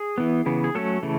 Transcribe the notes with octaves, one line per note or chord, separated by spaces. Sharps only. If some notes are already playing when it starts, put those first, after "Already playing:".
Already playing: G#4
E3 B3
C#3 E3 B3
G#4
F#3 A3 C#4 A4
C#3 E3 A3